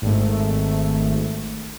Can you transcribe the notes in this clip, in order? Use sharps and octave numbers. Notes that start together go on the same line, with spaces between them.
G#1 A3